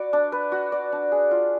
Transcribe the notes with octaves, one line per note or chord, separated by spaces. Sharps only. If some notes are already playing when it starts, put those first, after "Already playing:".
Already playing: F#4 B4 D5
D4
B4
F#4
D5
D4
G#4
F4